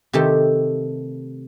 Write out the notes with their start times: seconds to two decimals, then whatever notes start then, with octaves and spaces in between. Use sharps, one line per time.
0.13 C3 D#3 A3 G4 A4